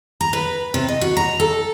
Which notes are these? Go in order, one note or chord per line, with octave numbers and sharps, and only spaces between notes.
A#5
B4
C3
D#5
F#4
A#5
A4